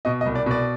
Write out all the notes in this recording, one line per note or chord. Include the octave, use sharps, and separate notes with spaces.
B2 D#5
D#5
C2
D5
B2 D5